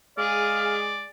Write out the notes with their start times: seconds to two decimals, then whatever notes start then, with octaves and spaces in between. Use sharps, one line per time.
0.18 G#3 G#4 D5 F5